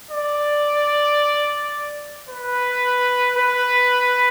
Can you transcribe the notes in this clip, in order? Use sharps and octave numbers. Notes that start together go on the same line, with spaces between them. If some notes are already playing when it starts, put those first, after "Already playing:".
D5
B4
B4